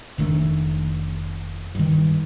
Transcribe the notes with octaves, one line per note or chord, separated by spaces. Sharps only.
F1 D#3 A3 D4
G2 D#3